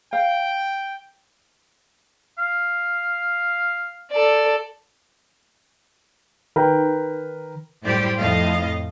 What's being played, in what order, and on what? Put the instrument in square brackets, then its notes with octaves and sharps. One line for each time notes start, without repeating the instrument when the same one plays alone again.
[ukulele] F5 [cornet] G5
[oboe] F5
[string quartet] A4 D5
[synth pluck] D#3 [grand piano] A#4 B4 G5
[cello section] F#2 A2 G3 G4 C5 D5
F2 A2 D#5 F5